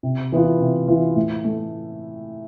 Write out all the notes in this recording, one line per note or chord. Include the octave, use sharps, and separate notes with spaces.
C3
E3 B3 F4
C3
E3 B3 F4
A2
A3